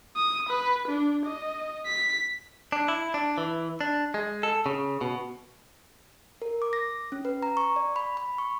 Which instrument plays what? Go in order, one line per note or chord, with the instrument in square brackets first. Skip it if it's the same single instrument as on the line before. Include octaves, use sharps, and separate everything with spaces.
[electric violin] D#6
B4
D4
D#5
B6
[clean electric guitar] D4
E4
D4
E3
D4
G#3
A4
C#3
B2
[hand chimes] A#4
D6
A#6
C#4
B4
A#5
C#6
D5
B5
B5
C#6